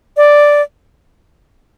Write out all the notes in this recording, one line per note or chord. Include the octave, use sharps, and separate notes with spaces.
D5